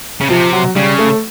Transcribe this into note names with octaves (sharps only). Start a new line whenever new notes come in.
C#3
C3 F3
F#3
C#3 G3
A3